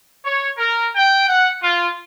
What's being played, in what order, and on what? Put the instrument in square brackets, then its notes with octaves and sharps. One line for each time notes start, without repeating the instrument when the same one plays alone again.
[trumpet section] C#5
A#4
G5
F#5
F4